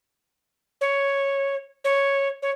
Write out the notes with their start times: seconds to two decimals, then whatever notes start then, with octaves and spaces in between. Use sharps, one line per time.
0.81 C#5
1.84 C#5
2.42 C#5